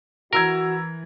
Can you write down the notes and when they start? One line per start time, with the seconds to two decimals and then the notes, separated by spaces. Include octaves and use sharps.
0.33 E3 F#4 A#4 A#5 E6 G#6